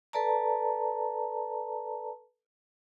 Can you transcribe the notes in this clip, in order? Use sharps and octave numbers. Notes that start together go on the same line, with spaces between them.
A4 B4 D5 A5 A#5